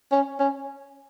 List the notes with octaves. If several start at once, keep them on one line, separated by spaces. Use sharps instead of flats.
C#4
C#4